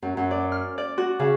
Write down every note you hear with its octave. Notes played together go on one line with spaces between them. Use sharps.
F#2
F#2
D5
F6
D5
F#4
C#3